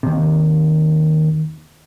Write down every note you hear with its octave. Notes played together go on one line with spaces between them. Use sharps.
D#2 C3